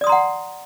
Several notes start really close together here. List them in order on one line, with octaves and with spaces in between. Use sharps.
D5 D#6 C6 A#5 F#5